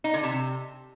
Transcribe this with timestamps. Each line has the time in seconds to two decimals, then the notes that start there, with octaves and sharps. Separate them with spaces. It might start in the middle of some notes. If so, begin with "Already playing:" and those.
0.04 D#4
0.14 D3
0.23 C3